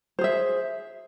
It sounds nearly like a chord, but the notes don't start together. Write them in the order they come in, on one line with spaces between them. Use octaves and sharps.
C5 G#4 E5